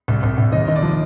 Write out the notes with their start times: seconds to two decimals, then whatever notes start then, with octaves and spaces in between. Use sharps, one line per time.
0.08 C2
0.23 C2
0.38 C2
0.52 D#2 D#5
0.67 D#2 D#5
0.76 D5
0.82 F3